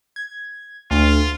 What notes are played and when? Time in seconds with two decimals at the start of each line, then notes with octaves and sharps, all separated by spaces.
0.16 G#6
0.91 D2 D3 F4